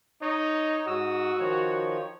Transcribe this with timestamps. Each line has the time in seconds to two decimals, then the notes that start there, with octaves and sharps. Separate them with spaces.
0.22 D#4 C#5 D#5
0.87 G#2 F#4 D#6 E6
1.40 D#3 F3 C#5